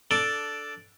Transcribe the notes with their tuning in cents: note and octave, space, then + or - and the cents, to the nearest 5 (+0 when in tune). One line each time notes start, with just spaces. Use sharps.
D4 -5 A4 +0 D5 +0